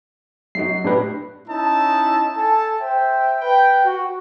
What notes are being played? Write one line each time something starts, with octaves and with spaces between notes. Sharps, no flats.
F#2 D#4 F#4 C7
A2 D4 G4 B4
C#4 D#4 E4 D#5 A5
A4 G#5 A5
C5 E5 G5
B4 G5
F#4